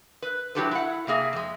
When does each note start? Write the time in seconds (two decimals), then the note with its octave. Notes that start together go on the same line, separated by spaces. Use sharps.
0.22 B4
0.55 F#3 E4 F#4 G4 A4 B4
0.71 E4 F#5
1.07 C3 A#3 G#4 E5
1.33 F2 G#3